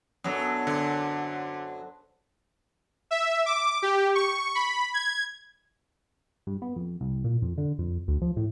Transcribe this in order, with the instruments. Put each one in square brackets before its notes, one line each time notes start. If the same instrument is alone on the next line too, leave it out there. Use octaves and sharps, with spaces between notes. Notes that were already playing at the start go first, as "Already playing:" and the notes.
[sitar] F#2 F#3 [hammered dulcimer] B3 D4 A4
[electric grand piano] D3 [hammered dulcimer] C5
[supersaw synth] E5
D6
G4
C#6
B5
G#6
[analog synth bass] G2
B3
F2
C2
A#2
F2
D3
F2
D2
F3
A2